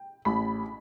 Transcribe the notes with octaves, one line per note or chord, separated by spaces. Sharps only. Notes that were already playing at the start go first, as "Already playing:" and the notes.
Already playing: G5
A1 B5